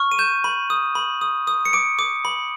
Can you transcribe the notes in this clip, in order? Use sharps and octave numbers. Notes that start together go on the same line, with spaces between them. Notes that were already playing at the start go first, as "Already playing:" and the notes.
Already playing: C#6 F6
D#7
G6 E7
B5
D#6
B5
D#6
D#6
C#7
D6 D7
D6
B5